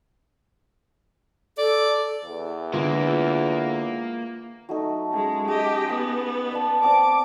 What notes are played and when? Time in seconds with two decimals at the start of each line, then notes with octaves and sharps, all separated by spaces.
1.58 A4 D5
2.24 E2
2.74 D3 G#3 A#3 B3 F4
4.69 F#3 A3 D#4
5.13 G#3 C#4 C#6
5.48 G4 G#4 D#5
5.89 B3 G5
6.52 D5 A5
6.83 C4 D5 D6